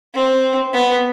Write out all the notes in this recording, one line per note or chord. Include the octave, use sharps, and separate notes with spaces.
C4
B3